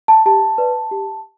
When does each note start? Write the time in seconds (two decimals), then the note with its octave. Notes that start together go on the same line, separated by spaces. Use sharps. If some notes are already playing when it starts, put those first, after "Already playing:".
0.08 A5
0.26 G4 A5
0.58 B4 D5
0.91 G4